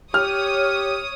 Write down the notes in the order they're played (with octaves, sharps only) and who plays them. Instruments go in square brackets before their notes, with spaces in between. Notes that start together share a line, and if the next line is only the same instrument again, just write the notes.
[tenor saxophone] G4 [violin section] C#5 D#6 [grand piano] F6